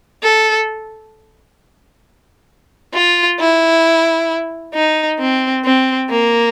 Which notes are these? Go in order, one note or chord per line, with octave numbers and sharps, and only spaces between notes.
A4
F4
E4
D#4
C4
C4
A#3